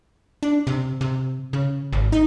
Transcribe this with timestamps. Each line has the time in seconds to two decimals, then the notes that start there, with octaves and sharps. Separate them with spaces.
0.43 D4
0.67 C3
1.01 C3
1.53 C#3
1.93 G#1
2.12 D#4